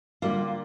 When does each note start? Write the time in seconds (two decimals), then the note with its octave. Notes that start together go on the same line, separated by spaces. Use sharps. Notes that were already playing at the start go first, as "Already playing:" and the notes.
0.22 D3 G3 A#3 F4